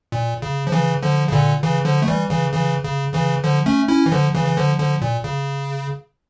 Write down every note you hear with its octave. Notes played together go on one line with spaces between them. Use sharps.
A#2
C#3
F3
C#3 E3
D3 F3
C#3
A#2 D3
C#3 E3
D3 F3
A3
E3 G3
C#3 E3
C#3 E3
C#3
C#3 E3
D3 F3
A3 C#4
C#4 E4
E3
D3 F3
C#3 E3
E3
D3 F3
D3 F3
A#2
C#3